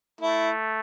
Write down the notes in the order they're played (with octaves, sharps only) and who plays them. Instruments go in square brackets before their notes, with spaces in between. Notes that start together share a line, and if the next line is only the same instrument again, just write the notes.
[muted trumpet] A3 [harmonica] E4